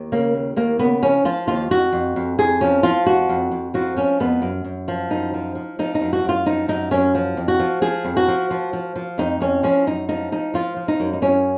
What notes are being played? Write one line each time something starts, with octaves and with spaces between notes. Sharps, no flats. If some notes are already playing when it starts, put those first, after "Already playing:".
Already playing: D#2
C#3 A#3
D#2
D#2 A#3
C#3 B3
F3 C#4
F3 F4
D#2 F4
F2 F#4
F2
F2
F2 G#4
F3 C#4
F3 F4
F2 F#4
F2
F2
F3 F#4
F3 C#4
F2 B3
F#2
F#2
F3
F#2 D#4
F3
F3
F3 D#4
D#4
F#2
F#4
F#2 F4
F3 D#4
F#2 D#4
F#2 C#4
F3
F2
F#4
F3
F3 G#4
F2
F#4
F3
F3
F3
F3
F2 D#4
F2 C#4
F3 C#4
F#2 D#4
F3 D#4
F3 D#4
F3 F4
F3
D#4
F#2
D#4
F#2 C#4